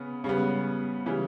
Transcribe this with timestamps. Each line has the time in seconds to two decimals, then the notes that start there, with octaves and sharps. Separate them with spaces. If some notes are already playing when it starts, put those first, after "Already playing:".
Already playing: C#3 B3
0.24 C#3 G3 B3
1.06 C#3 E3 G3